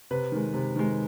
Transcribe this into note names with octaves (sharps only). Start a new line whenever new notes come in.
C3 B4
D#3 G#3
C3
D#3 G#3